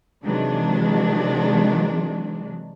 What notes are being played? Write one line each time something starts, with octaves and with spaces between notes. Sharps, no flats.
C3 D#3 E3 F#3 G#3 D4